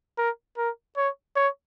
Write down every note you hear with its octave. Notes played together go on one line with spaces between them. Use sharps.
A#4
A#4
C#5
C#5